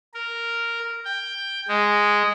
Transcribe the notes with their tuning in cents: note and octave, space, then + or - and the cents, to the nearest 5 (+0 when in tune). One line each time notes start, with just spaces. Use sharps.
A#4 -5
G5 +10
G#3 -5